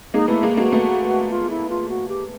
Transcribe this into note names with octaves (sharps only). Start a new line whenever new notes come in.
G#3 A#3 D#4
A3 B3 E4
G#3 A#3
G#3 A#3 F#4
A3 B3
F4
E4
F4
F#4
G4